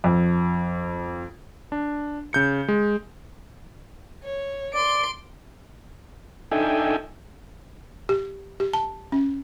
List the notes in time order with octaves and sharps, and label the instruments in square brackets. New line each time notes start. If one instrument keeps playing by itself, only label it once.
[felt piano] F2
[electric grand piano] D4
C#3 G6 C#7
G#3
[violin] C#5
[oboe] D5 [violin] C6 D7
[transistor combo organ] D4 D#4 A4 E5 G5 G#5
[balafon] G4
G4
A5
C#4